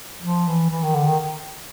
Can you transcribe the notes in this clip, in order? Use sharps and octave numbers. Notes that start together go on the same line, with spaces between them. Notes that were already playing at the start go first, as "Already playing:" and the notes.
F3
E3
E3
D#3
D3
D#3